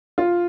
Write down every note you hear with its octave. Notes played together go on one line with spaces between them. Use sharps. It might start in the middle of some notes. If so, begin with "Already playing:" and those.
F4